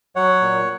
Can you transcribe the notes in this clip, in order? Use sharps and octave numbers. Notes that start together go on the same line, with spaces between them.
F#3 C#5 F#5
A#2